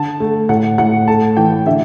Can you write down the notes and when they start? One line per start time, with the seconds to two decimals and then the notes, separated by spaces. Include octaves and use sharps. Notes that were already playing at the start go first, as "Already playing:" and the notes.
Already playing: D3 A5
0.20 A3
0.49 A2 F#5
0.78 A2 F#5
1.07 A3 A5
1.37 E3 G5
1.66 D3 E5